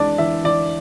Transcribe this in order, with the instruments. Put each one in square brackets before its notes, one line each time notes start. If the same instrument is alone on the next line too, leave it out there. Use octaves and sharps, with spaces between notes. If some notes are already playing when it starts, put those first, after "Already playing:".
Already playing: [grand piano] E3 G#3 D4 D5
E3 E5
E3 D5